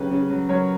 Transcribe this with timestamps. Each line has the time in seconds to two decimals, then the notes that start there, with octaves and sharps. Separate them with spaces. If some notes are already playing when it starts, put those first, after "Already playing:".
Already playing: C#3 F#3 G4 B4
0.11 C#3
0.30 F#3
0.49 F#3 A#4 C#5